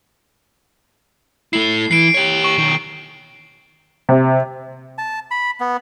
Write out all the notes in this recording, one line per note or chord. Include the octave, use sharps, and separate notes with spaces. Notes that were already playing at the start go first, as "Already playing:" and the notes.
A3 E4 C7
E3 C7 D7
G4 C#5
C#6
B1 D#3
C3
A5
B5
B3